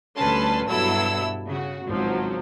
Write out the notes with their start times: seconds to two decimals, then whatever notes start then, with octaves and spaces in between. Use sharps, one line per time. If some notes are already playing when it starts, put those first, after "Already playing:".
0.16 D2 G3 C#4 B4 A5 C6
0.68 G2 B2 F#3 E4 A4 E6
1.47 C#3 F#4
1.86 G#1 C#2 F3 F#3